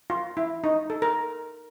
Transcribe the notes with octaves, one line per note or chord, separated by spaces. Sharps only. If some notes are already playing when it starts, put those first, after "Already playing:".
F4
E4
D#4
A4
A#4